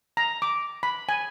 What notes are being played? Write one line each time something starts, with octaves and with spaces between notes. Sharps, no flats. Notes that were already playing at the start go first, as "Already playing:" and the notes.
A#5
D6
B5
G#5